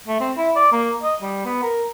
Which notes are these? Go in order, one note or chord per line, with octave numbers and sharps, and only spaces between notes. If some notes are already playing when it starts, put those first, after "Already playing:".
A3
C4
E4
D5
A#3
D#5
G3
B3
A#4